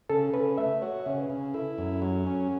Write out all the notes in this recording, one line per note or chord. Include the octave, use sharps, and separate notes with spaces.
C#3 A4
C#3 B4
A3 E5
F#4 C#5
E5
C#3 C#5
B4
C#3
E4 A4
F#2
F#3
C#4